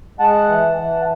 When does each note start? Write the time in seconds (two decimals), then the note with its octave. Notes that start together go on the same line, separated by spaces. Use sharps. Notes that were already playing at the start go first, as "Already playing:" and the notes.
0.20 G#3 F#5 A5
0.48 E3
0.77 E3